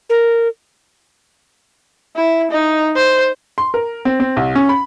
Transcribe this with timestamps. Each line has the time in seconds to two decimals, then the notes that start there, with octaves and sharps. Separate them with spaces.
0.10 A#4
2.16 E4
2.51 D#4
2.96 C5
3.58 C6
3.74 A#4
4.05 C4
4.20 C4
4.37 C2
4.55 C#4
4.69 B5